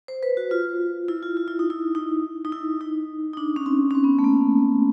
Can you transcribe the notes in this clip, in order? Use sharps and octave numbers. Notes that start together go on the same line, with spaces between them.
C5
B4
F#4
F4
E4
F4
F4
E4
D#4
E4
D#4
D#4
E4
D#4
D#4
D4
C#4
C4
C#4
C4
B3
A3
A#3